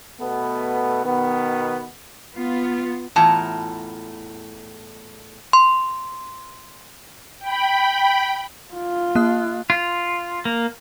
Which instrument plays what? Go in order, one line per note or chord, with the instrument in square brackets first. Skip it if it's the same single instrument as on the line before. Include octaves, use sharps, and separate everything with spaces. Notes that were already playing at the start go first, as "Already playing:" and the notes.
[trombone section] B2 A3 B3
B2 D#3 B3
[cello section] B3 F4
[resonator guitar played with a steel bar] E2 A2 F4 A5 A#5
[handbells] C6
[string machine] G5 B5
[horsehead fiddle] F4
[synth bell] A#3 F#6
[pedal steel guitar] F4
A#3